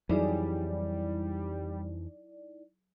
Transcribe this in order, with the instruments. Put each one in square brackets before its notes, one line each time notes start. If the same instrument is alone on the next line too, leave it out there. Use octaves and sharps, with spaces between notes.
[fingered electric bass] F2 E3 [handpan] F#3 G#4 [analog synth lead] G3 [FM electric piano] D#4 E4 D5